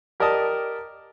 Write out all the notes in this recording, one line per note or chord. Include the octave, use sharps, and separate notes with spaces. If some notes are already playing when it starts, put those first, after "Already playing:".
G4 A#4 D5 D#5 A5 D#6